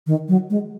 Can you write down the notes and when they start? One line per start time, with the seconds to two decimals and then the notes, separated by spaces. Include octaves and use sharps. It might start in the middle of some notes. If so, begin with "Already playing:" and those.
0.07 D#3
0.28 F#3
0.50 G#3